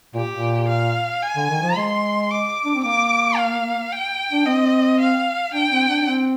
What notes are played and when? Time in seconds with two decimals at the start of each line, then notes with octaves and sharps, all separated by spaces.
0.14 A#2 G4
0.31 A#2
0.68 F5
1.22 G#5
1.37 D3
1.50 D#3
1.62 F3
1.76 G#3 C6
2.31 D6
2.65 D4
2.75 C4
2.84 A#3 D6
3.38 F5
3.92 G5
4.31 D4
4.46 C4 D#5
5.00 F5
5.54 D4 G5
5.72 C4
5.89 D4
6.01 D4
6.07 C4